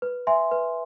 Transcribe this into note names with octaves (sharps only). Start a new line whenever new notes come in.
B4
E5 G#5 C6
B4